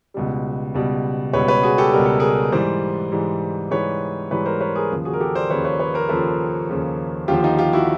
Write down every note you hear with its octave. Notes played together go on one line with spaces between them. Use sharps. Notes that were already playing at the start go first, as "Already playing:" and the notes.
C#2 B2 G3
C#2 B2 G3
C#2 B2 G3 B4 C#5
B4 C#5
F#4 G#4
G4 A4
C#2 B2 G3 A#4
A4
G#4 A#4
G#2 E3 G3 C5 D5
G#2 E3 G3
G#2 E3 G3 B4 C#5
G#2 E3 G3 B4 C#5
A#4 C5
B4 C#5
G#4 A#4
D#2 C#3 F3
F#4 G#4
A#4
G4 A4
C5 D5
D#2 C#3 F3 B4 C#5
B4 C#5
B4 C#5
A#4 C5
D#2 C#3 F3 A4 B4
D#2 C#3 F3
D#2 D3 F3 F4 G4
D#4 F4
F4 G4
E4 F#4